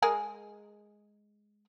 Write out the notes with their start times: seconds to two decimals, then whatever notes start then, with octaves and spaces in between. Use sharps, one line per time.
0.02 G#3 G#4 A#4